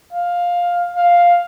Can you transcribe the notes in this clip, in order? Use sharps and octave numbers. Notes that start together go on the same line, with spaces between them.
F5
F5